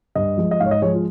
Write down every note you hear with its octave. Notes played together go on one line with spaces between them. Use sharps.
G2 D#5
F3 G#3
D#5
G#2 F5
C#5
D#5
F3 G#3 C#5
F4